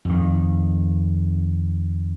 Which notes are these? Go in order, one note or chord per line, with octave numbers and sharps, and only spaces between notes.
F2 D#3